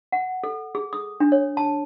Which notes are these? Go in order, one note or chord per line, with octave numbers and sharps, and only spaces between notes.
F#5
A4
G#4
D#6
D4
C#5
A5